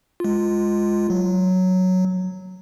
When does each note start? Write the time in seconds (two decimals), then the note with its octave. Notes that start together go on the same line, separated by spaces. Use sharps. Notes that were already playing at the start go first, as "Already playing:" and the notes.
0.20 G#3 F4
1.10 F#3